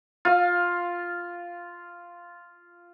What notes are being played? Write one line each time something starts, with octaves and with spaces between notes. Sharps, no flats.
F4 F5